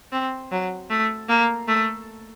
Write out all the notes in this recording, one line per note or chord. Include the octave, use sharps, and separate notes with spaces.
C4
F#3
A3
A#3
A3